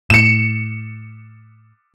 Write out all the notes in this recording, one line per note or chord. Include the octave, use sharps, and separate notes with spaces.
A2 C#7 E7